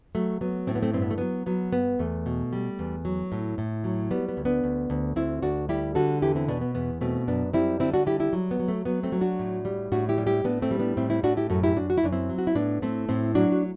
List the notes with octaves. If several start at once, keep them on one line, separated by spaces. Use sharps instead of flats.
F#3 A3
F#3 B3
A2 C4
B3
A3 C4
G2 C4
B3
A3
F#3 B3
F#3 B3
G2 B3
E2 A3
B2
G3
E2
F#3
A2
A2
F#3
G3 B3
B3
D2
B3 D4
D2
D2
D2 C4 E4
D2 D4 F#4
G3 E4 G4
D3 F#4 A4
E2 E4 G4
C4 E4
B2 B3 D4
B3
E2 B3
B2 A3 C4
F#2 B3 D4
G3 C4 E4
D3 C4 E4
D4 F#4
G3 E4 G4
E4 G4
F#3
B3
F#3
A3
F#3 B3
A3 C4
F#3
D4 F#4
A2
G3
A2 D4 F#4
E4 G4
G3
E4 G4
A2 B3 D4
A3 C4
G3
B3 D4
A2 C4 E4
C4 E4
A2 D4 F#4
E4 G4
F#2 F#4 A4
E4 G4
F#2 D4 F#4
F#4
E4
F#2 D4
C4 E4
F#3
F#4
E4
A2 B3 D4
A2 A3 C4
A2 C4 E4
F#3 D4 F#4
F#4